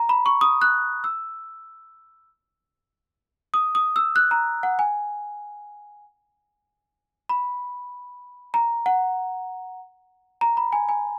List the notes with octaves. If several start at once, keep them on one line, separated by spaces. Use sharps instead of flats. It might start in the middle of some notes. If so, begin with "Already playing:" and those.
Already playing: A#5
B5
C#6
D#6
F#6
E6
D#6
D#6
E6
F#6
A#5
F#5
G#5
B5
A#5
F#5
A#5
B5
G#5
G#5